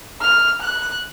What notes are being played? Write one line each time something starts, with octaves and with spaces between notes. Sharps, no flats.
F6
F#6